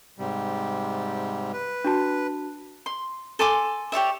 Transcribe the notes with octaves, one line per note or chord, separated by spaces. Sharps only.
G#2 C3 G3
B4
D4 F#4 A5
C6
A4 G#5 C6 D6
G4 C#5 D5 E5